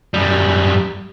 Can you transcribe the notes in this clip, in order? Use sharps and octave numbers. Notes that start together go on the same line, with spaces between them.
F#2 G3